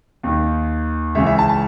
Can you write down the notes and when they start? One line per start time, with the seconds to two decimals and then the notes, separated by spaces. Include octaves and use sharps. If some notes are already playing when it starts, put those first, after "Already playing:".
0.23 D#2 D#3
1.15 C#2 C#3 E3 E5
1.27 E5
1.39 A5
1.49 A5